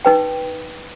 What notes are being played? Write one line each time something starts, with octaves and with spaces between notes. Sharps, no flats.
D#4 B4 G5